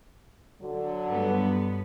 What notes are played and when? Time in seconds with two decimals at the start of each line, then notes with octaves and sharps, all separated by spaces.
0.61 D3 F#3
1.07 G2 B3